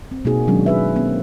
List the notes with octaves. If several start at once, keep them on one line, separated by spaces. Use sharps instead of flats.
C4
B2 A#3 D#4 F#4 G#4
D#3 F#3 G#3 C#4 D4
D#4 G#4 B4 E5
A#3 C4